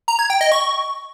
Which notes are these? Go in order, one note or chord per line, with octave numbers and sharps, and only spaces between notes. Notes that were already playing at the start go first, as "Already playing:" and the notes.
A#5
G#6
G5
D#5
C#6